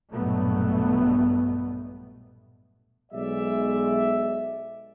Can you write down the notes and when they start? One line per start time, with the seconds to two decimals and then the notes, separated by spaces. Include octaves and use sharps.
0.12 A#1 G2 B2 F#3 A3 B3
3.12 B1 G#3 D5 E5